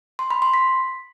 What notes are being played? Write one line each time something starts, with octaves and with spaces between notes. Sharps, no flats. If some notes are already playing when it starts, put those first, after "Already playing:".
C6
B5
C6
B6